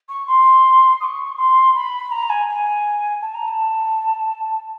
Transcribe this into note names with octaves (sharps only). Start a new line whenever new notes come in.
C#6
C6
D#6
C#6
C6
B5
A#5
G#5
G#5
A5
A#5
A5